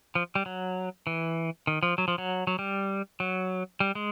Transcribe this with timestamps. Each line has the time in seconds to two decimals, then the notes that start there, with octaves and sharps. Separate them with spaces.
0.15 F3
0.35 G3
0.46 F#3
1.07 E3
1.67 D#3
1.83 F3
1.98 F#3
2.08 F3
2.18 F#3
2.47 F#3
2.59 G3
3.20 F#3
3.80 G3
3.95 G#3